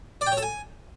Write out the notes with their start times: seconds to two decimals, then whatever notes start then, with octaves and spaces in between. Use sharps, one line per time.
0.21 D5
0.27 G5
0.32 C#5
0.37 A4
0.43 G#5